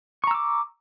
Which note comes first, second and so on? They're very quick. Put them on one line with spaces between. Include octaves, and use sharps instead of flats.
C#6 A#5 E6 D6